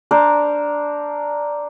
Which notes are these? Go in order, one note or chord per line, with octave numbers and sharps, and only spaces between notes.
D4 A#4 C5